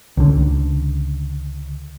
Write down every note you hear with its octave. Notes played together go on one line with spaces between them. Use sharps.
C#2 D3